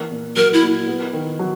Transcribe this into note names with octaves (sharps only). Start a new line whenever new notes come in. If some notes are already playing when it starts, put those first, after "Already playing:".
Already playing: E3 A#3
A#2
F#3 A#4
E4
A#2
B3
D#3
F#3